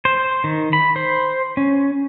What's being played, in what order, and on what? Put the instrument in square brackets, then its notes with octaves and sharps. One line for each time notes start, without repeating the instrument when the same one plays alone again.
[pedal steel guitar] C5
D#3
B5
C5
C#4